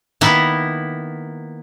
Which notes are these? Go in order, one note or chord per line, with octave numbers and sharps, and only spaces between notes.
D#3 A#3 B3 E4